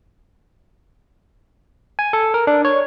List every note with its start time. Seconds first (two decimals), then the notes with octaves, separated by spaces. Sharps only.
1.99 G#5
2.13 A4
2.34 A#4
2.47 D4
2.65 C#5